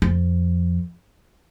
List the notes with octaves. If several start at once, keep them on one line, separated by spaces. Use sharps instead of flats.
F2